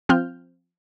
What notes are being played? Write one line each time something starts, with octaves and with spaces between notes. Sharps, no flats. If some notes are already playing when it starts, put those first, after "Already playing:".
F3 C4 F4 F6 G6